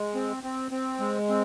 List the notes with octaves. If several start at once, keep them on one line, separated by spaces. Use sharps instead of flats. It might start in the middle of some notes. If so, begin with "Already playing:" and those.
Already playing: G#3
C4
C4
C4
G#3
C4